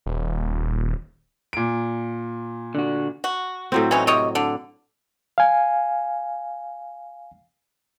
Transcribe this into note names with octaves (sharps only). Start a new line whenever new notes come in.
D#1
A#2 D7
D3 F#4
F#4
A2 F#3 C4
E3 C#4 D#4
C3 C#5 D#5
D3
F5 G#5